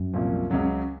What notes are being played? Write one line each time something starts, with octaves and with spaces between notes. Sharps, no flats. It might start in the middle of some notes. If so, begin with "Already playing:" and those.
Already playing: F#2
C2 A#2 F3
C#2 C#3 F#3 C#4